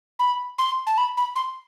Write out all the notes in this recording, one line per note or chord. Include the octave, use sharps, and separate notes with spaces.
B5
C6
A5
B5
B5
C6